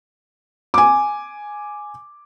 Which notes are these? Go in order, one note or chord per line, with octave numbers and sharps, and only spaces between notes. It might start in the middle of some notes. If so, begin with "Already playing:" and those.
G#5 D6